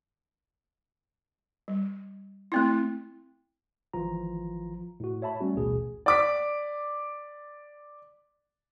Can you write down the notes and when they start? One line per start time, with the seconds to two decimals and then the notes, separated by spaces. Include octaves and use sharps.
1.68 G3
2.52 A3 C4 E4
3.93 G#1 E3 F3 F4 A#5
5.00 A2 F#4
5.22 C#5 E5 A5 B5
5.40 G3 A3 C#4 F#4
5.55 A1 D2 B2 G#4
6.06 D5 D6 B6